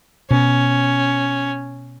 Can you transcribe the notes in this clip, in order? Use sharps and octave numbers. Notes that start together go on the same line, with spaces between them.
B2 C#4